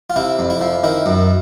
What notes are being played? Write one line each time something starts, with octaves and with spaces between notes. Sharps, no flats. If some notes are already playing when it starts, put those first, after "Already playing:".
F4
C3 E4
F2
E4
F3
D#3 E4
F#2